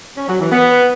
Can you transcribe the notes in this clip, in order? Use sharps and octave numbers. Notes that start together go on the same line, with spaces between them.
C#4
F#3
E3
B3